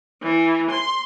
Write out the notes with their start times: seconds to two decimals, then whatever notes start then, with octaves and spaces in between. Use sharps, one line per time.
0.21 E3
0.71 C6